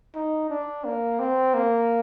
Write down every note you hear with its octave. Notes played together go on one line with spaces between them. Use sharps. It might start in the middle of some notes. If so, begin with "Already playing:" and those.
D#4
D4
A#3
C4
A#3